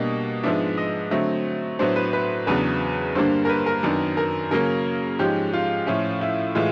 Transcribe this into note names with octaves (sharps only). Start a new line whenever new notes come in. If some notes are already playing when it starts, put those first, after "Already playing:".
Already playing: B2 G3 A#3 D4 D#5
G#2 F3 G#3 B3 D4 E5
D#5
D3 F#3 A3 C4
A2 F#3 B3 D4 C5
B4
B4
E2 C#3 F#3 B3 D4 B4
G2 D3 G3 A#3 D4 C5
A#4
B4
A#4
F#2 D#3 F#3 B3 D4
A#4
C#3 F#3 A#3 C#4 A#4
G#2 F3 G#3 C#4 G4
F4
A2 F3 A3 C#4
E4
A2 E3 G#3 F4